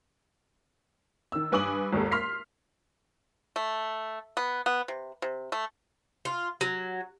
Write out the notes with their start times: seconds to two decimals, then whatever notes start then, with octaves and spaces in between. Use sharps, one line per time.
1.32 D#3 E6
1.52 G2 B4 G#5 D6 D#6 F#7
1.93 G#1 D#2 G4 A4
2.11 C6 F6 B6 C7
3.56 A3
4.37 B3
4.66 B3
4.88 C3
5.22 C3
5.52 A3
6.25 F4
6.61 F#3